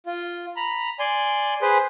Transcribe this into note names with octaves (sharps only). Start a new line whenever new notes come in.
F4
A#5 B5
D5 G#5 C6
G#4 B4 C5